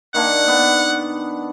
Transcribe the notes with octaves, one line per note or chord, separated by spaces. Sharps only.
D#3 A#3 D4 F#5
B3